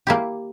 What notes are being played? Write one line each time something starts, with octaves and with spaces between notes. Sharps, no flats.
A#3 E4 G4